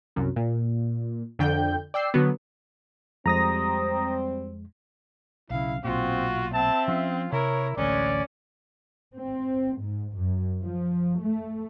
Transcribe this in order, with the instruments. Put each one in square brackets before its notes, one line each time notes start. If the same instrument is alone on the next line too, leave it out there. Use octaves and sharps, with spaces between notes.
[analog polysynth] C2 F#2
A#2
F2 D3 G5 G6
D5 G5 E6 C7
D3 F#3 B3
[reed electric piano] F2 G#3 [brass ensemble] G3 C4 [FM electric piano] A#5 D#6 A#6
[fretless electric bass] B1 C#3 [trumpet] E4 [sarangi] F5
[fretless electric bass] B1 A#2 [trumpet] C4 [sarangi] F4 [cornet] F#4
[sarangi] C4 [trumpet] E5 [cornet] A5
[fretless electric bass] F3 C#4 [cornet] F4
[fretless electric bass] C3 [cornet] E4 [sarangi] A#4 [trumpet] C#5
[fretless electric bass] A1 D2 [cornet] G#3 [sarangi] C#4 [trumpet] D5
[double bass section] C4
G#2
F#2
F3
A3